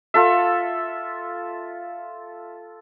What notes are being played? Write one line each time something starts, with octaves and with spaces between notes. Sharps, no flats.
F4 A4 E5